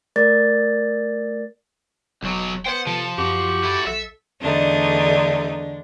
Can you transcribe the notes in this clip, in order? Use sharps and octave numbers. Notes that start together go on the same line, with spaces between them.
A3 A#4 D5 A6
E1 B1 F#3 D#4
B3 C5 F#5 G5
C3 F3 A4
F#2 F#4 G4
E4 A4
B1 A4 E5
E2 D3 A3 D4 D#4